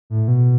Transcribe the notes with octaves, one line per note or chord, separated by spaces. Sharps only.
A2
B2